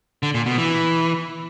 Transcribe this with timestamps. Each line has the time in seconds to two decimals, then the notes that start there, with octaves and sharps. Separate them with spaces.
0.23 D3
0.34 A#2
0.46 B2
0.58 E3